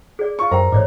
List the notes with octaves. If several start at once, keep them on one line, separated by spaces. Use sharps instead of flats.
G#4 D5
F4 C#6
F#2 A#4 C5 G5 A#5
A1 G#2 C#5 D5 D6